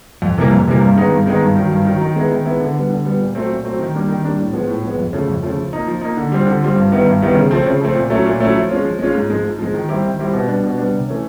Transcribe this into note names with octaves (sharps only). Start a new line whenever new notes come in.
F2
C3 E3 G3 A#3
F2
C3 E3 G3 A#3
G2
D#3 G#3 B3 D#4
G2
D#3 G#3 B3 D#4
G2
D#3 F#3
G2
D#3 F#3
D#3
G#3 B3 E4
D#3
G#3 B3 E4
D3
G3 B3
D3
G3 B3
A#2
F#3 A3 C4
A#2
F#3 A3 C4
D#3
G3 A#3 D4 G4
D#3
G3 A#3 D4 G4
A2
F3 G#3 B3
A2
F3 G#3 B3
F2
C#3 F3 A3
F2
C#3 F3 A3
F3
A#3 D#4
F3
A#3 D#4
D3
G3 C4 F4
D3
G3 C4 F4
G2
D#3 G3 B3 E4
G2
D#3 G3 B3 E4
C#3
F3 A3 C4
C#3
F3 A3 C4
A#2
F#3 A3 C#4 E4
A#2
F#3 A3 C#4 E4
F3
G#3 C#4 F4
F3
G#3 C#4 F4
G#2
F3 G#3
G#2
F3 G#3
D#3
G3 C4 E4 G4
D#3
G3 C4 E4 G4
B2
G3 B3 D4
B2
G3 B3 D4
C3
E3 A3 C#4